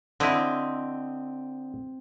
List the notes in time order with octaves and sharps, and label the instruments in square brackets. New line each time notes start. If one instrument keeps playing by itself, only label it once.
[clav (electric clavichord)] D3 E4 [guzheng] C4 D#5